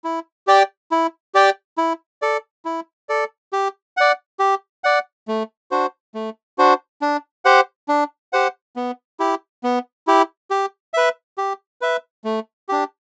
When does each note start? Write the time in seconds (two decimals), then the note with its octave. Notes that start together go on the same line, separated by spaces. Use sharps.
0.04 E4
0.47 G4 D5 G5
0.92 E4
1.35 G4 D5 G5
1.78 E4
2.22 A4 D5
2.65 E4
3.09 A4 D5
3.53 G4
3.97 D5 F#5
4.39 G4
4.84 D5 F#5
5.28 A3
5.71 D4 F#4 C5
6.14 A3
6.58 D4 F#4 C5
7.02 D4
7.45 G4 C5 F#5
7.89 D4
8.33 G4 C5 F#5
8.76 B3
9.20 E4 G4
9.64 B3
10.07 E4 G4
10.50 G4
10.94 B4 E5
11.38 G4
11.81 B4 E5
12.24 A3
12.69 D4 G4